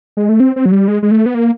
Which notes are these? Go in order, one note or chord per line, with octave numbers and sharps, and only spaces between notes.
G#3
A3
C4
C4
F#3
G3
G#3
G#3
A3
B3
A#3